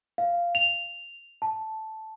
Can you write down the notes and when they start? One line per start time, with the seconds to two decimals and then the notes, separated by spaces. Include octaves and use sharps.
0.18 F5
0.55 F7
1.42 A5